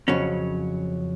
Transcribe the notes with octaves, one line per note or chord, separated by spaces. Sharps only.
F2 C#3 F#3 C#4